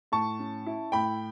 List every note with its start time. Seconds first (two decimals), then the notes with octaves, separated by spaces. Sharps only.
0.12 A2 A5 C#6
0.39 C#4
0.66 E4
0.92 A2 G5 B5